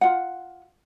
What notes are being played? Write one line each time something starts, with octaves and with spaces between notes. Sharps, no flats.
F4 F#5